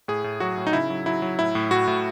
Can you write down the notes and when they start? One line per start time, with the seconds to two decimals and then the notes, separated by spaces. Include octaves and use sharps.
0.08 A2 G#4
0.24 A2
0.40 F#3 F#4
0.57 A2
0.67 D#4
0.73 C#3 E4
0.90 F#3
1.06 F#3 E4
1.22 F#3
1.39 A2 E4
1.55 A2
1.71 A2 F#4
1.87 A2